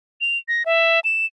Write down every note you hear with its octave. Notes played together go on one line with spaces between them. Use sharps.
F7
A#6
E5
E7